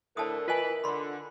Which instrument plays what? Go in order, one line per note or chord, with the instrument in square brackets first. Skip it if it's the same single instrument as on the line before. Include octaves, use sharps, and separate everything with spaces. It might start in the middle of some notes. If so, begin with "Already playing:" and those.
[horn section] A2 D3 E4 [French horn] A#4 [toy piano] C5 A5 D#6
[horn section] E3 B4 [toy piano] F4 D#5 G#5
[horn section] D3 [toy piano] B5 C6